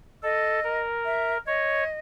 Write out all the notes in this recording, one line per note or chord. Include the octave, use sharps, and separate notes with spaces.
A4 D#5
A#4
E5
C#5 D#5